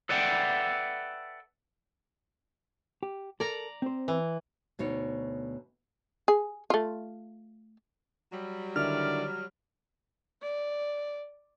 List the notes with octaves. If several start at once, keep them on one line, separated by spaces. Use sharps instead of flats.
A4 B4 D5 E5 F#5 G5
G4
A4 A#4 D5 A#5
C4 C5
E3
D2 B2 D#4 C#5
G#4
A3 F4
F#3 G3
D3 D#3 E4 D5 F6
D5